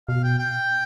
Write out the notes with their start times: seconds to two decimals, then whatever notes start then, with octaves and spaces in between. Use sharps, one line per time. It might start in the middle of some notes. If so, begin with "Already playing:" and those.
0.08 B2 F5
0.24 G5
0.39 G5